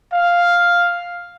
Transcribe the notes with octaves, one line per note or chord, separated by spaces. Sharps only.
F5